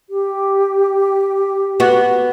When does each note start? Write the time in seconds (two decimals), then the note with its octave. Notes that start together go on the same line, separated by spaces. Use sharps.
0.10 G4
1.80 B3 F#4